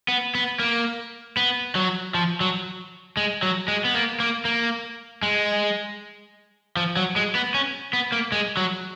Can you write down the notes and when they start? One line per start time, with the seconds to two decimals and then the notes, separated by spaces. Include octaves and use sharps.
0.08 B3
0.35 B3
0.60 A#3
1.37 B3
1.75 F#3
2.14 F3
2.41 F#3
3.17 G#3
3.43 F#3
3.68 G#3
3.85 B3
3.94 A#3
4.20 A#3
4.45 A#3
5.23 G#3
6.77 F3
6.97 F#3
7.16 G#3
7.35 B3
7.54 C#4
7.93 B3
8.12 A#3
8.32 G#3
8.57 F#3